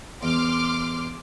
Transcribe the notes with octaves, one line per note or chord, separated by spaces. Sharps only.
E2 C6 D6 F6